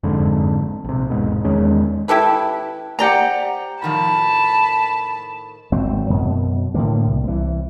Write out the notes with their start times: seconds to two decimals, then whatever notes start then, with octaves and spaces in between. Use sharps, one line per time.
0.03 F#1 F2 G#2 D3
0.85 A#1 C3
1.10 E1 A#1 G#2 B2
1.45 E2 D#3 G#3 C#4
2.08 E4 G4 A4 B4
2.99 G4 C5 D5 F#5 A#5
3.82 A2 D#3 F3 A5 B5
5.72 G#1 F#3 C4
6.10 F#2 B2
6.74 A2 D3 A#3
7.07 C2
7.24 C2 E3